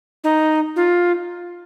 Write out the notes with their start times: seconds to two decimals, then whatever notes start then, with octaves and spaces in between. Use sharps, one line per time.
0.24 D#4
0.76 F4